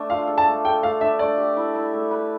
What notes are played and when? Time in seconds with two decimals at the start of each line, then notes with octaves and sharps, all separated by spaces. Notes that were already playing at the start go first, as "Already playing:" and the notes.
Already playing: A3 D4 A4
0.10 F4 F5
0.27 A4
0.38 A5
0.46 A3
0.65 A4 G5
0.83 A3 F5
1.01 D4 E5
1.19 A3 D5
1.37 G4
1.57 E4
1.75 E4
1.93 A3
2.11 B4